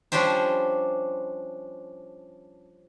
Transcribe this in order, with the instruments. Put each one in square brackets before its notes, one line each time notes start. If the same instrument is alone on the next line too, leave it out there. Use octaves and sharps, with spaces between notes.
[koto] F3 G3 C#4 D4 G4 C5